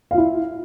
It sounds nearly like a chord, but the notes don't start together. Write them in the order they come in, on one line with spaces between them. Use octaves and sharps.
F5 F4 E4